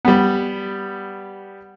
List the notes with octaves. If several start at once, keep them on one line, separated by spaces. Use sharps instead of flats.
G3 B3